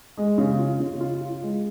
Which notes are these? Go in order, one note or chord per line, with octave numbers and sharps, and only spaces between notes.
G#3
C#3
F4
C#3
F4
F4
G#3